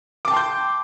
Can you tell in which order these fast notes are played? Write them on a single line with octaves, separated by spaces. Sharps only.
D6 A5 G5 C6 G6